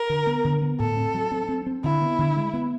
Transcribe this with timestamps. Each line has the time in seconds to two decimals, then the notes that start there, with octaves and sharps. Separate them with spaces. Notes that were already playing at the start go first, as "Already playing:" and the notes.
Already playing: A#4
0.10 D3
0.27 B3
0.45 D3
0.62 B3
0.79 A2 A4
0.97 C4
1.14 F#3
1.31 C4
1.49 C4
1.66 C4
1.84 D3 E4
2.01 B3
2.19 D3
2.36 G#3
2.54 B3